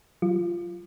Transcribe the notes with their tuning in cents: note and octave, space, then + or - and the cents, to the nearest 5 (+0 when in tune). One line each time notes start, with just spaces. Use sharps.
F#3 +0 F4 -15